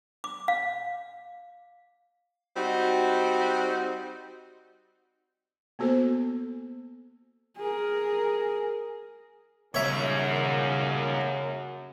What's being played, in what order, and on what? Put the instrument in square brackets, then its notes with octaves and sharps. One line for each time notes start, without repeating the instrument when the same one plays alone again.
[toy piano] D6
F5
[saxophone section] G3 C4 D#4 F#4
[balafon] A#3 B3 F#4 A4 C5
[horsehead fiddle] G#4 A#4
[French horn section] F#2 [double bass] C#3 [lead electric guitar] G3 A#3 [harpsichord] C#5 E5